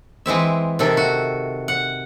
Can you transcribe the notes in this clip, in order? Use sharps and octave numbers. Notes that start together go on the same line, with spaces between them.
E3 G#3 C4 E5
C3 D#3 A4 E5
F#4
F#5